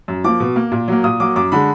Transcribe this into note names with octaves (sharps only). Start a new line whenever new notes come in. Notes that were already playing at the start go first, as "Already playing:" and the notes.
F#2
F3 A#3 D6
B2
A#3
A#2
F#3 A#3
A#2 D#6
F#3 A#3 D6
F#2 D6
D3 G#3 B5